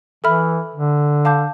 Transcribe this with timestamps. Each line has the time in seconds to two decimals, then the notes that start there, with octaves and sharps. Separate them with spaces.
0.24 E3 A4 E5 B5 F6
0.75 D3
1.25 F5 A5 D6 G6